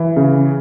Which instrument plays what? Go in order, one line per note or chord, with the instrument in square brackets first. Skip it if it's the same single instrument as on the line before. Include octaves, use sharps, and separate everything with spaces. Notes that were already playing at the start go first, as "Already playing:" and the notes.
Already playing: [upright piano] E3
C#3